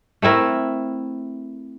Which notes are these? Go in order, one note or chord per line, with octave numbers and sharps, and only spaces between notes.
A3 C4 E4 A#4